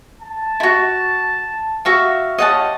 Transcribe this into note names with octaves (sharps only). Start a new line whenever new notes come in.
A5
E4 F#4
F#4 E5 F5
F4 G4 C#5 D#5 F#5 A5